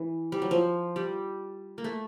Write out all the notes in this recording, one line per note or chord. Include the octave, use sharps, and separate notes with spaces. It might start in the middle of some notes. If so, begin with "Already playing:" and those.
Already playing: E3
G3
F#3
F3
G3
A#3
A3